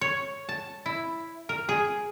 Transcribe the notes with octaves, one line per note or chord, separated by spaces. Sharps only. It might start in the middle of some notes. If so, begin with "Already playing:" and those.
C#5
A5
E4
A#4
G#4